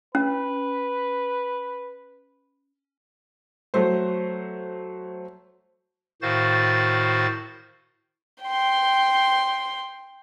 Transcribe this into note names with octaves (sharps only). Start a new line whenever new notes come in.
C#4 B4
F#3 A3 C5
A2 D#3 F#4 C5 F5 A6
G5 C6